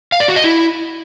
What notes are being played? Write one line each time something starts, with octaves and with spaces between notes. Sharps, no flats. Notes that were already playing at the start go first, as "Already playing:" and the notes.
F5
D5
F#4
D#5
E4